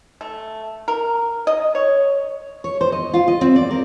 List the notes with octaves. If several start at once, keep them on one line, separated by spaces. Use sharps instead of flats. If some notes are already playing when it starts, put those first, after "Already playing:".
A3
A#4
D#5
C#5
C#5
C5
D#5
F4
D#5
C4
D5
A#4